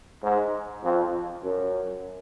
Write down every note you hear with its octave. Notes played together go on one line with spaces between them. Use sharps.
G#2
F2
F#2